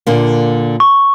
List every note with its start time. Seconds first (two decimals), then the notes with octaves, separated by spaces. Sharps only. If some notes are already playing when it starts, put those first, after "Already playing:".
0.06 A#2 D3 A#3
0.80 C#6